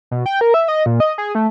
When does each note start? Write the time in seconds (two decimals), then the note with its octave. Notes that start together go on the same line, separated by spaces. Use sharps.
0.11 B2
0.26 G5
0.41 A#4
0.54 E5
0.68 D#5
0.86 A#2
1.00 D#5
1.18 G#4
1.35 A3